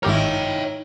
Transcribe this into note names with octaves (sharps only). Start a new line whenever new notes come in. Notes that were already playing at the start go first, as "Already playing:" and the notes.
G#1 A#2 D#3 E4 G4 A#4 C#5 G5